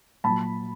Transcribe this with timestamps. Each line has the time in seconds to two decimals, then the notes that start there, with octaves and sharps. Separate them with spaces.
0.24 A#2 F#3 A5 B5